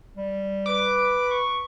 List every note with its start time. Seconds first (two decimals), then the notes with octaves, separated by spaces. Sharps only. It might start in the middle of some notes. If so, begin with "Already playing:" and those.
0.17 G3
0.66 B4 D6
1.31 C#6